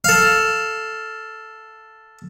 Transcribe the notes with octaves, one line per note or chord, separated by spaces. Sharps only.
A4 F5